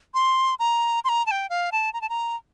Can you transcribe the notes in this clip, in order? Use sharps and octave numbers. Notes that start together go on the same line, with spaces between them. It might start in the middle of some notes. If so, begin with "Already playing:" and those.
C6
A#5
C6
A#5
A5
G5
F5
A5
A#5
A5
A#5